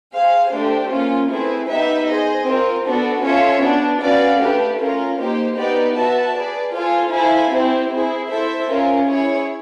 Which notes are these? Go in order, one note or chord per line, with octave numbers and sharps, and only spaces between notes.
G#4 C5 F5
A3 D4 G4 C5
A#3 C#4 F4
A3 C4 E4 G#4 B4
B3 D#4 G4 B4 E5
G#4 C5 D#5
C4 F4 A#4
B3 D4 F#4 A4
C#4 F4 A4 C#5 E5
B3 D4 F#4
C#4 F#4 B4 D5 F5
A3 D4 G4 B4
C#4 F4 A#4
A#3 D#4 G4 C5
B3 D#4 G4 B4 D5
F#4 B4 E5 A5
G#4 B4 D5
F4 A4 C5 F5 G#5
E4 A4 C5 F5 G#5
C4 E4 G4 C5
C4 E4 G#4
E4 A4 C5 E5
C#4 F4 A#4
E4 G#4 C#5